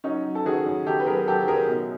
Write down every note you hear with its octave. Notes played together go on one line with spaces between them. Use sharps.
F#3 C#4 D#4
F#3
A4
D#3 F#4 G#4
F#2
D#3 G4 A4
B4
F#3 G#4 A#4
F#3 G4 A4
F#2 G#4 A#4
B2